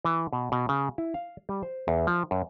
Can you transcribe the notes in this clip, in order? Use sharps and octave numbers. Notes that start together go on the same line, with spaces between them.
E3
B2
B2
C#3
E4
F5
G3
C5
E2
F3
F#2